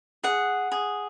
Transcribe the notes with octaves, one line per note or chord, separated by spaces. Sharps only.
G#4 F#5
G#4